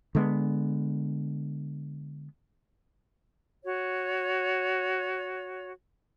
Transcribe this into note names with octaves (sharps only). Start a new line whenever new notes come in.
D3 G#3 B3
F#4 C#5